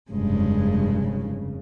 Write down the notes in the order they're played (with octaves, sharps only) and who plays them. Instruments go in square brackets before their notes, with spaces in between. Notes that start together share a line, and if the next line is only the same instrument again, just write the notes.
[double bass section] F1 C#3 [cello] G2 G#3